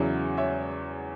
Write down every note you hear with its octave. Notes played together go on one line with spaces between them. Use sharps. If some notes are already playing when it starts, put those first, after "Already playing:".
Already playing: E2 C#3 F#3 C#4 E4 C#5
C#5 E5